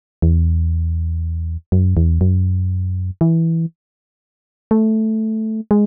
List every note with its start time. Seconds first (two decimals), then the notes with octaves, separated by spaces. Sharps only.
0.22 E2
1.72 F#2
1.97 E2
2.21 F#2
3.21 E3
4.71 A3
5.71 G#3